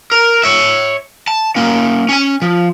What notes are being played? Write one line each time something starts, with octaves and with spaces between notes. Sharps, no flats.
A#4
C#5 E5
A5
A#3 C#4
C#4 G#5
F3